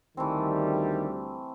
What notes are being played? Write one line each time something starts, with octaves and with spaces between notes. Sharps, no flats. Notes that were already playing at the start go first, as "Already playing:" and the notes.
D2 D#3 E3 G3 A3 C4